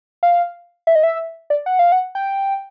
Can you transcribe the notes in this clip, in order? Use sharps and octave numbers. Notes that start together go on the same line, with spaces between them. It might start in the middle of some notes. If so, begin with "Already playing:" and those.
F5
E5
D#5
E5
D5
F#5
F5
F#5
G5